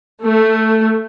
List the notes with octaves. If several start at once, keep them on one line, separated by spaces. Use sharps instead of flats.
A3